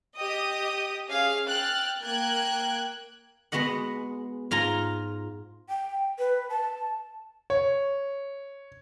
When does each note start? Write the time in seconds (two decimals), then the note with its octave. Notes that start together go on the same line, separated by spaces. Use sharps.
0.18 G4 D#5 D#6
1.08 C#4 G#4 F5
1.47 G5 F6 F#6 A6
2.02 A#3 G5 F#6 G#6
3.52 G#3 B3 F#4 D#5 F#5
4.51 G#2 F4 G#5 A#5
5.69 G5
6.19 B4
6.50 A5
7.50 C#5